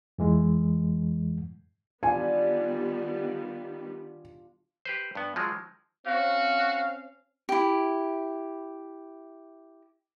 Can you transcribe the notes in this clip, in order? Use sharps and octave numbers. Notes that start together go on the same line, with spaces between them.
F2 E3 G#3
D#3 G3 B3 D4 F4 G#5
G4 B4 C5
G2 B3
F3 F#3 G#3
C4 C#4 F#4 F5
E4 G4